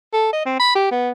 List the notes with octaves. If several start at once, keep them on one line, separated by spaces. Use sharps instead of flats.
A4
D#5
C4
B5
G4
B3